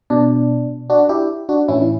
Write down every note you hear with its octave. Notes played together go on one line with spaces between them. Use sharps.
B2 D4
D4 F#4
E4 G4
D4 F#4
A2 E3 C#4 E4
E4